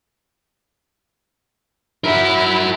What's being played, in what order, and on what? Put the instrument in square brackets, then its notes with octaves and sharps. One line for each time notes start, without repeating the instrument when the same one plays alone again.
[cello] E4 [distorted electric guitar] F#4 A#4